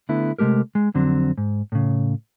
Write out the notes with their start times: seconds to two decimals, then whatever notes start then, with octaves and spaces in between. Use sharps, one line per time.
0.09 D3 A3 B3 E4
0.39 C3 G#3 A3 G4 A#4
0.75 G#3
0.94 F2 D3 F#3 C4
1.38 G#2
1.72 A2 C#3